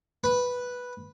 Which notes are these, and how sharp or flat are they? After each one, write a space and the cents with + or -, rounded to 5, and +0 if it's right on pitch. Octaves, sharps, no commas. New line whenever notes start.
B4 -5